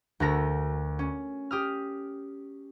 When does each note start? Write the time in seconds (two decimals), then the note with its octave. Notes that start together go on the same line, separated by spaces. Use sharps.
0.20 D2 F#4 A4 A#4 A#6
0.99 C#4
1.51 G4 D#6 F6